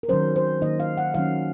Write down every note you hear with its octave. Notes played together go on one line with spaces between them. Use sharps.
A#4
D#3 F#3 C#4 C5
C5
D#3 A#3 D#4 D#5
F5
F#5
D#3 F#3 C#4 F5